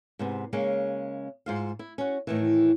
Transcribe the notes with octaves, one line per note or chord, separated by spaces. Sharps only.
G#2 C3 B3
C#3 G#3 A#3 C#4
G#2 F4 F5
E4
C#4 F#4
A2 D#3 E3